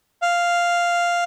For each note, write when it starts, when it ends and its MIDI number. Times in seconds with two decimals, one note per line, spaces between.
0.22 1.24 77